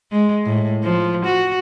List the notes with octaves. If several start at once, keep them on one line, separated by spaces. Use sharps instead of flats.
G#3
A2
F3
F#4